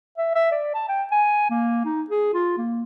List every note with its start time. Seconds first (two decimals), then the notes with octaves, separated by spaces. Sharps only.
0.18 E5
0.35 E5
0.52 D5
0.74 A5
0.89 G5
1.12 G#5
1.50 A#3
1.85 D#4
2.10 G#4
2.34 F4
2.58 A#3